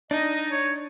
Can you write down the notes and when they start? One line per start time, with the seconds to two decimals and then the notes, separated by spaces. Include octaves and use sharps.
0.11 D4 D#4 D#5
0.50 C#5